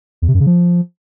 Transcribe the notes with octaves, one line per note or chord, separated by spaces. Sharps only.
E2
C3
F#2
C#3
F3